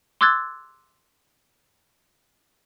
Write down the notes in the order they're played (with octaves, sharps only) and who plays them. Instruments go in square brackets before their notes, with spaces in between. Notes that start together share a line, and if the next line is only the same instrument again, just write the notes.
[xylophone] C6 D6 E6 F#6 G#6 A6